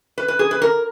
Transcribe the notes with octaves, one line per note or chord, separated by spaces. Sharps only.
B4
B4
G#4
B4
A#4